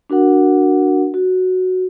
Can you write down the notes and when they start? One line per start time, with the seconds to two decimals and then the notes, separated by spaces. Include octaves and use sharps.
0.10 D4 F#4 A#4 F#5
1.14 F#4